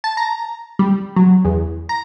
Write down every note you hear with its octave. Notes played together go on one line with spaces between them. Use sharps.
A5
A#5
G3
F#3
E2
A#5